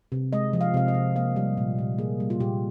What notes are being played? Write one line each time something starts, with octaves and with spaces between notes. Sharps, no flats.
C3
G#3 D#5
F3
F5
C3 F5
D#5
C3
A#3 F5
G3
A#2
A#2
A#3 G#4
G3
F4
A#2 G4